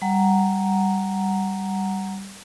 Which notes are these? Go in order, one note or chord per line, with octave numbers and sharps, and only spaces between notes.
G3 F#5 A#5